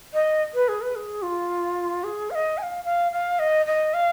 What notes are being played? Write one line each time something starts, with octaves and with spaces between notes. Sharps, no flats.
D#5
B4
G#4
B4
G#4
F4
G#4
F5
D#5
G#5
F5
F5
F5
D#5
D#5
F5